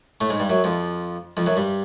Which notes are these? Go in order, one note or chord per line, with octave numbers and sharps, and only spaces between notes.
A2 A3
G#2 G#3
G2 G3
F#2 F#3
F2 F3
F2 F3
F#2 F#3
G2 G3